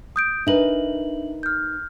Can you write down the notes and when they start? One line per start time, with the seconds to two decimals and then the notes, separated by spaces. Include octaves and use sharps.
0.16 D#6 G6 D7
0.47 D4 D#4 A#4 B4 E5 F#7
1.43 F6 G6